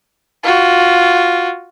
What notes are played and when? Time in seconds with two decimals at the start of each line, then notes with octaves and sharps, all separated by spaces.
0.43 F4 F#4